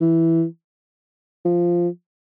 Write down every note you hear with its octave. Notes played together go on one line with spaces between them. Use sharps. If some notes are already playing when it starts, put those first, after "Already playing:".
E3
F3